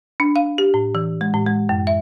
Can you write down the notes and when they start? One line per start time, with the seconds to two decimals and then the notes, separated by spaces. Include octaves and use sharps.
0.20 D4
0.36 F5
0.58 G4
0.74 A2
0.95 E3
1.21 G#3
1.34 A2
1.46 G#3
1.69 F#2
1.87 E5